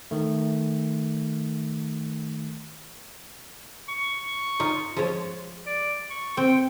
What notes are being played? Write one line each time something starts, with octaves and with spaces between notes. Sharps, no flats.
D#3 A3
C#6
D#4 F4
F3 G#3 C#5
D5
C#6
C4 G5